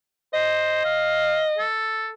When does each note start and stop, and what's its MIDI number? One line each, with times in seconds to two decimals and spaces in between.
0.34 0.81 72
0.34 1.63 75
0.85 1.46 77
1.58 2.11 69